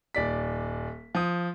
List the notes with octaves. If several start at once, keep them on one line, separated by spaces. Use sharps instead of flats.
D#1 D5 B6
F3 D#6